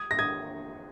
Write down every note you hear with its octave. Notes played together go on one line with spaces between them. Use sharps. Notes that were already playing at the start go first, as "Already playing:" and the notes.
Already playing: D#6 G#6
A#6
D#6 G#6